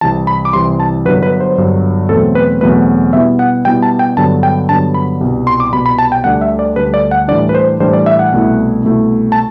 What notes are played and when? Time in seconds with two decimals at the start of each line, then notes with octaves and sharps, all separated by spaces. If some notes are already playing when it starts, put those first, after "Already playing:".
0.01 C2 C3 E3 A5
0.27 B5
0.45 D6
0.53 C2 C3 E3 C6
0.80 A5
1.05 G1 G2 F#3 B4
1.23 B4
1.40 C5
1.57 G1 G2 F#3
2.09 E2 B2 F#3 A3 C4 A4
2.35 B4
2.61 E2 B2 F#3 A3 C4 B4
3.13 B2 G3 B3 E4 E5
3.39 F#5
3.65 B2 G3 B3 E4 G5
3.82 A5
3.99 G5
4.17 G2 D3 F#3 B3 A5
4.43 G5
4.69 G2 D3 F#3 B3 A5
4.94 B5
5.21 C2 B2 G3
5.47 C6
5.60 D6
5.73 C2 B2 G3 B5
5.86 B5
5.98 A5
6.12 G5
6.24 D2 D3 G3 D4 F#5
6.41 E5
6.59 D5
6.76 D2 D3 G3 D4 B4
6.94 D5
7.11 F#5
7.28 A2 E3 G3 D4 D5
7.49 B4
7.55 C5
7.80 A2 E3 G3 D4 C5
7.93 D5
8.06 E5
8.19 F#5
8.33 C2 B2 A3 E4
8.84 C2 B2 A3 E4
9.32 A5